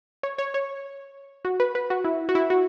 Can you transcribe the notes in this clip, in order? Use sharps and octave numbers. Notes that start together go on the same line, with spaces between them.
C#5
C#5
C#5
F#4
B4
B4
F#4
E4
F#4
E4
F#4